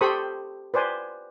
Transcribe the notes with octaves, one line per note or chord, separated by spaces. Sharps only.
G4 A4 C5 B5 C#6 D#6
B4 C5 D5 G#5